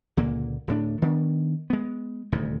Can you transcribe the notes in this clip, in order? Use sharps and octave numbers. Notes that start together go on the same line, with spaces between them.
C#2 A#2 D3 A#3
D1 A2 D4
D#3 B3 D4
G#3 B3
D#1 D2 G#2 C3